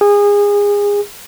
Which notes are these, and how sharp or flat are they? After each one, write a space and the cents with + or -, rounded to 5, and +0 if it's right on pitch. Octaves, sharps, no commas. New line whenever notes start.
G#4 -25